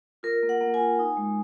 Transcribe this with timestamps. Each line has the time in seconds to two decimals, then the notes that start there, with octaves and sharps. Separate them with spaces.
0.23 F4 A#4
0.43 A#3
0.49 F#5
0.61 A#3
0.74 G#5
0.80 F4
0.99 D#4
1.17 G#3